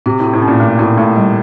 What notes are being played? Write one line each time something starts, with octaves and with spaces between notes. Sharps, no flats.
C3 F#4
A2 F#4
A2
C#4
A#2
A#2 A3
A2 F#4
A2 A3
G3